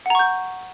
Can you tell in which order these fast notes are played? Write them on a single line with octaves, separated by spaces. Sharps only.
F#5 A#5 C#6 G6